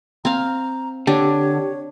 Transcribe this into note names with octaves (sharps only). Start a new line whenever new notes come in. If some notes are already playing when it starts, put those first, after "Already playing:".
C4 F5 A#5
D3 D4 G4 C#5